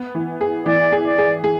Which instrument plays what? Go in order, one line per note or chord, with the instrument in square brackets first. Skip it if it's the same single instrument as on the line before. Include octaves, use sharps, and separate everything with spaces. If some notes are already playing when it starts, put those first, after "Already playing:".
Already playing: [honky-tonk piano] B3
E3
G#4
[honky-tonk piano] E3 [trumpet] D5
[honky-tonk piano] G#4
[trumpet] D5
[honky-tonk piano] G#4
G#4